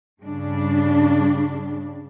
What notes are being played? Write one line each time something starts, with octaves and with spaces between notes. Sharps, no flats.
G2 C#3 G3 D4